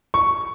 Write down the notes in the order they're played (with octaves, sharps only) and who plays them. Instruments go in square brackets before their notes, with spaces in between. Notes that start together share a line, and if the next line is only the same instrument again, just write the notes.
[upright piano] C#6